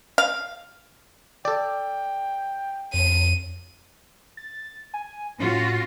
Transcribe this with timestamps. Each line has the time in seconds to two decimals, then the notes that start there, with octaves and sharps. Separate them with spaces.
0.18 F5
1.45 A4 D5 G5
2.94 F2 D#7
4.37 A6
4.94 G#5
5.41 A2 C#4 F4 F#4